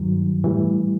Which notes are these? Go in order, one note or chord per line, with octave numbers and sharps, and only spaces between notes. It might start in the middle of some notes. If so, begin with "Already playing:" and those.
Already playing: G2 D#3 F#3
A2 E3 G3